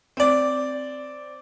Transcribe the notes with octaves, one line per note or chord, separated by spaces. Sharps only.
C4 D5